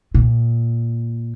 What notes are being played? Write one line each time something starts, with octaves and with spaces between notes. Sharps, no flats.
A#2